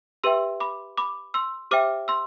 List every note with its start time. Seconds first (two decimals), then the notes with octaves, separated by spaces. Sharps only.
0.24 G4 B4 E5 G5 C6 E6
0.60 B5 D6
0.98 B5 D6
1.34 C6 E6
1.71 G4 C5 E5 G5 D6 F6
2.08 C6 E6